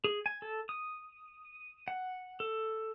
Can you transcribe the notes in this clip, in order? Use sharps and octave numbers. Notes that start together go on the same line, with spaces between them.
G#4
G#5
A4
D#6
F#5
A4